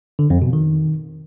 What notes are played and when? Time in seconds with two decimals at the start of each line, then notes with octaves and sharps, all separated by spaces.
0.19 D3
0.30 F2
0.42 B2
0.53 D#3